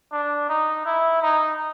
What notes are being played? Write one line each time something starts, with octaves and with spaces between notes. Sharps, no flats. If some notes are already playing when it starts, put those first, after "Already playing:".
D4
D#4
E4
D#4